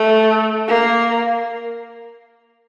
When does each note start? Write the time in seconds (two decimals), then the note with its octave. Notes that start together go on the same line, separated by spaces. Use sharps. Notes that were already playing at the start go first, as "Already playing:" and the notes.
Already playing: A3
0.68 A#3